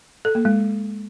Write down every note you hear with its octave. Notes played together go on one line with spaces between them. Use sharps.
A4
A#3
G#3